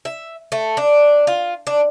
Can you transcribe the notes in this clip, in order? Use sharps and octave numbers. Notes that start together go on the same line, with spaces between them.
E5
A3
D4
F4
D4